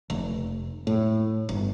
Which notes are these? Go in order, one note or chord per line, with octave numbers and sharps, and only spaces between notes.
F1
A2
G1